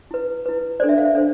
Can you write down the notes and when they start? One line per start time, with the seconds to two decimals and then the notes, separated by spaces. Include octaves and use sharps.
0.11 E4 B4
0.46 E4 B4
0.80 C5 D5
0.82 D4 A4
0.89 E5
0.98 F5
1.05 E5
1.15 D4 A4 C5